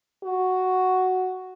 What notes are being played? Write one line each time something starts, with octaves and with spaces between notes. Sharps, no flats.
F#4